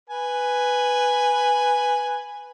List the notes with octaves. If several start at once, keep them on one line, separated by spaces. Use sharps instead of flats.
B4 G#5